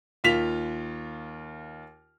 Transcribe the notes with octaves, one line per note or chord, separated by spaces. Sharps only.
D#2 F4 B6 F7